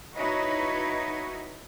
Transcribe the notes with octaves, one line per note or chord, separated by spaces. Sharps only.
D#4 E4 F#4 B4 C#5 D#5